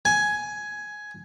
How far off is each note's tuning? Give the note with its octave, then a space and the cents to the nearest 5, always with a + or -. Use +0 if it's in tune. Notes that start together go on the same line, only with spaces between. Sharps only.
G#5 +10